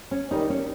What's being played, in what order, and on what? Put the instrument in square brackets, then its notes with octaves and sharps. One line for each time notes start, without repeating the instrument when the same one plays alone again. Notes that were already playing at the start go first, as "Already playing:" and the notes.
[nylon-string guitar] C#4
[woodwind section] D#3 G3 [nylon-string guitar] D#4
[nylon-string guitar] C#4